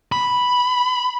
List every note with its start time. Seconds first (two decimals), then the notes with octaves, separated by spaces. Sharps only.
0.12 B5